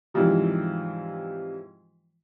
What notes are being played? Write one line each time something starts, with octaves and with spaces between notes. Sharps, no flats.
G#2 C3 E3 F3 G3